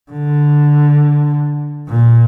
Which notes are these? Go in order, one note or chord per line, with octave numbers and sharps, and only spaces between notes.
D3
A#2